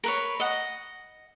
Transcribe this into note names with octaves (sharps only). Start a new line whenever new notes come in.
A#4 B4 C#5
D#5 F#5